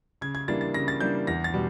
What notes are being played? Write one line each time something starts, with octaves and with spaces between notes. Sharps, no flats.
C#3 G#6
G#6
E3 G3 A#3 D4 A6
A6
C#3 A#6
A6
E3 G3 A#3 D4 G6
E2 A#6
A6
B2 G3